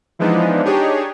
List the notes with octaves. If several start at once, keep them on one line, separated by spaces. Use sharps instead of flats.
E3 F3 G#3 B3 D4 D#4
D4 D#4 G4 G#4 C#5